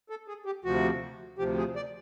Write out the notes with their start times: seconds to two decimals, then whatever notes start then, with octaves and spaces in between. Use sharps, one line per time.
0.10 A4
0.28 G#4
0.46 G4
0.64 D2 C3 F3 F#4
1.38 D2 C3 F3 G4
1.58 G#4
1.76 D5